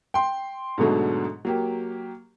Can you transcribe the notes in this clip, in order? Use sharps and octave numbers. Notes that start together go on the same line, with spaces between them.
G5 C6
G#2 B2 D3 F#3 A3
F#3 A#3 G4